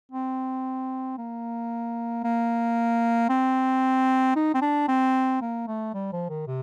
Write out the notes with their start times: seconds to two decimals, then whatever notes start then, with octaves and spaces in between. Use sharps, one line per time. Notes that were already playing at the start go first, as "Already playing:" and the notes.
0.11 C4
1.18 A#3
2.24 A#3
3.29 C4
4.36 D#4
4.54 C4
4.62 D4
4.88 C4
5.41 A#3
5.67 A3
5.94 G3
6.12 F3
6.29 D#3
6.47 C3